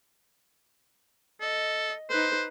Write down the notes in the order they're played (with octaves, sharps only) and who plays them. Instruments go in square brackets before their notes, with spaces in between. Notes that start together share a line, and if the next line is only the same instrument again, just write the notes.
[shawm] A4 [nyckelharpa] D#5
[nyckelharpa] D#4 B4 [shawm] C5